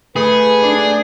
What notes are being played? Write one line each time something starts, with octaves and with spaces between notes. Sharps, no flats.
A3 G#4 B4
D4